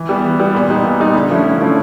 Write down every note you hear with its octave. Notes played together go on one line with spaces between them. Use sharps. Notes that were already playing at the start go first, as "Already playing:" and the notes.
Already playing: E3
G3 B3
E3
G3 B3
A#2
G3 B3 D#4
A#2
G3 B3 D#4
D3
F3 A3 C#4 E4
D3
F3 A3 C#4 E4